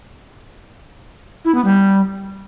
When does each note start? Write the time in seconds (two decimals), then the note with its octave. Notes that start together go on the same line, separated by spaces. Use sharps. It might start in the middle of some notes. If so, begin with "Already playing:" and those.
1.45 E4
1.55 B3
1.65 G3